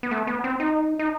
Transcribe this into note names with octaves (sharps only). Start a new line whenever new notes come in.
B3
A3
B3
C4
D#4
D#4